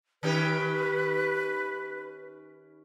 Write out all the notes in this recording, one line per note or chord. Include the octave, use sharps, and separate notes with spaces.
D#3 C#4 G4 B4